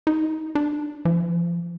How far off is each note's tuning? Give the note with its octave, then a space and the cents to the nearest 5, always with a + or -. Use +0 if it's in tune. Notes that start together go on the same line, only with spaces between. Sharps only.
D#4 +20
D4 +20
F3 -30